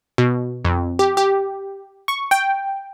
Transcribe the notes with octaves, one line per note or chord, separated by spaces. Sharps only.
B2
F2
G4
G4
C#6
G5